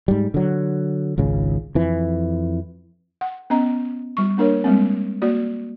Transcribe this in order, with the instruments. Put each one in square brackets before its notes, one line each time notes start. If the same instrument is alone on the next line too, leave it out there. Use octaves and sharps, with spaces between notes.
[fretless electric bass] G#2 G3
D3 F#3
G#1 C#2 C#3
F2 E3
[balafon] F#5
B3 C#4 D#5 A#5
G3 C#6
A#3 D4 A#4 C#5
G3 G#3 A#3 C4
A#3 F#4 D5